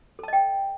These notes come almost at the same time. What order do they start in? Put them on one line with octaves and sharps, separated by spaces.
A4 A5 D#5 G5